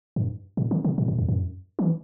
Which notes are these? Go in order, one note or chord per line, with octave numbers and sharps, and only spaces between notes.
G2
A2
D3
C3
A2
G2
E2
F#2
E3